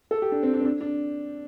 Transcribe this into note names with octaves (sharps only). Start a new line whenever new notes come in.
A4
G4
D4
C4
D4
C4
D4
D4